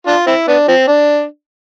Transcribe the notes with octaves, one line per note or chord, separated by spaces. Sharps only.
D4 F4
C4 E4
B3 D4
F3 C4
D4